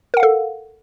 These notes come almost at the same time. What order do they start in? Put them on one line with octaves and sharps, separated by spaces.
A#4 F#5 F5 A4